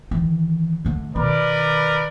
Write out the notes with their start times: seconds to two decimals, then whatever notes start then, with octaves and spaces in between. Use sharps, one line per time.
0.11 D#3 E3
0.85 D3 A3
1.16 B2 D#3 A#4 B4 D5